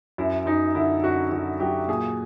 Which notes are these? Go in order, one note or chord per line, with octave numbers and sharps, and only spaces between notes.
F#2 E4
F#2 D#4
D3 E4
F#2 F#4
D3 F#4
F#3 G4
A#2 G#4